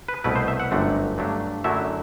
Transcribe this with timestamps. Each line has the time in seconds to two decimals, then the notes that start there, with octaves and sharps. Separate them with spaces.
0.08 B4
0.24 C2 B2 A3 E4 B4
0.36 C5
0.48 E5
0.60 F#5
0.71 G1 F#2 D3 A3 C4
1.18 G2 F#3 A3 D4
1.64 F#2 D3 F#3 A3 E4 E5